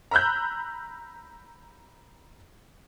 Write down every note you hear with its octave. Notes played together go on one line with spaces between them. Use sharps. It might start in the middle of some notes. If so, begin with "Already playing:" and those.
A#5 B5 E6 F#6 G6